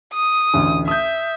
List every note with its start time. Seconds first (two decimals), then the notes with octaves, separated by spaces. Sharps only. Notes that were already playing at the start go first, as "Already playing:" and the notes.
0.14 D#6
0.54 A1 D2
0.88 E5 D#6 G6